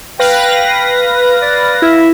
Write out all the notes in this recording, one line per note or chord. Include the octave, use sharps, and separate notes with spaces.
B4 F5 G5 A#6
D5
E4 E5